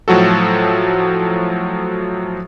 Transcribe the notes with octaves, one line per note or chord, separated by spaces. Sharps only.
A2 F3 F#3 F#4 A4